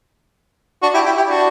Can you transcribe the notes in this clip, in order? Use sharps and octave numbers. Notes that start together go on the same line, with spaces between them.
D4 F#4
E4 G4
E4 G4
E4 G4
D4 F#4